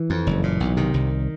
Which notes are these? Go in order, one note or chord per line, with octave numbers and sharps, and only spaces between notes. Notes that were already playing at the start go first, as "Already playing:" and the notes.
Already playing: E3
F2
F#1
A#2
B1
C3 D#3
C2